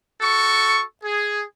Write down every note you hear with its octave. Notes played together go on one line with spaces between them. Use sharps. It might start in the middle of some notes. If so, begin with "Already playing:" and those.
F#4 A4 C#6
G#4